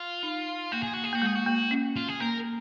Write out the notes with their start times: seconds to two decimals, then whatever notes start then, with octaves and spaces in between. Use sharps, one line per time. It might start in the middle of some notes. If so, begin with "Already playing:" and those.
Already playing: F4
0.23 D#4
0.72 A#3 F#4
0.83 G#4
0.93 F#4
1.04 G#4
1.13 A#3 F#4
1.22 G#3 G#4
1.35 F#4
1.46 A#3
1.71 C#4
1.96 F4
2.08 G#4
2.20 A#3 A#4